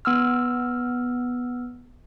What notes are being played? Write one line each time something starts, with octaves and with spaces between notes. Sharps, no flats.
B3 E6 F6